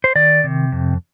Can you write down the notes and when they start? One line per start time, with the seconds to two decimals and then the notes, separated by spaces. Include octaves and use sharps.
0.04 C5
0.15 D#3 D5
0.44 C3
0.72 F2